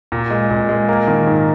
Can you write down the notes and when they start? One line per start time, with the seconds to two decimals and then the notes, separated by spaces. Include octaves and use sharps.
0.12 A#2
0.30 G#3
0.50 A#2
0.69 G#3
0.89 A#3
1.08 D#3
1.27 G#2